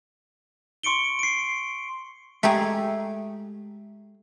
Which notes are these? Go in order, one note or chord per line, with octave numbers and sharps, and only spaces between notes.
C6 C#6 C#7 D7 G7
C7 D7
G#3 A3 G4 G#4 E5 G5 A#5